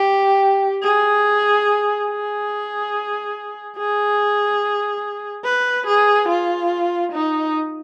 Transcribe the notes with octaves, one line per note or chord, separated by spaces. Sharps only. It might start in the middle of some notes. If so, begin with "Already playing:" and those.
Already playing: G4
G#4
G#4
G#4
B4
G#4
F4
D#4